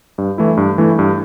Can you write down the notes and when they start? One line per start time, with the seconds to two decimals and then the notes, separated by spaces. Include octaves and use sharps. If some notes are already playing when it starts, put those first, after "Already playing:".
0.18 G2
0.38 E3 A3 E4
0.57 G2
0.78 E3 A3 E4
0.99 G2